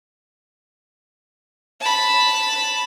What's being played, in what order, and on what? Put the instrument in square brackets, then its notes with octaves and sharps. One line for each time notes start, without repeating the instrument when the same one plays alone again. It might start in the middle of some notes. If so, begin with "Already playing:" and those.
[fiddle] A5 B5